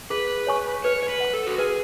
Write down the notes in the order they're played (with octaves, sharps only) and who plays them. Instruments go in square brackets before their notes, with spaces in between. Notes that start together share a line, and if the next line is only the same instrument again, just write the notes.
[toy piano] G#4 [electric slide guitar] B4
[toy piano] C#5 G#5 C#6
[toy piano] B4 [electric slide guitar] C#5
[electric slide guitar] C#5
B4
[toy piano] F#5 B5
[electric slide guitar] A4
F#4
[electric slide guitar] G#4 [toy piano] B4